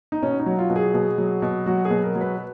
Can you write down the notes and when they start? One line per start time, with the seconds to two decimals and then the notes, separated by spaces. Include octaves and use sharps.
0.12 D#4
0.23 B2 C#4
0.40 D#4
0.46 F#3
0.58 F4
0.70 B2
0.76 G#4
0.94 B2
1.18 F#3
1.42 B2
1.66 F#3 F#4
1.85 G#4
1.90 B2
2.04 A#4
2.16 F#3
2.21 B4